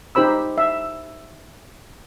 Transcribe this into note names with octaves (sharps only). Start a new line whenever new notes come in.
D#4 G4 C5 B5 E6
E5